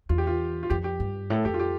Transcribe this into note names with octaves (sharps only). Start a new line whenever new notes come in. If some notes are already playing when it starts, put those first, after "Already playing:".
E2 F4
G4
F4
F4
F2 G4
G4
G2
A2 A4
F2 G4
F4
G4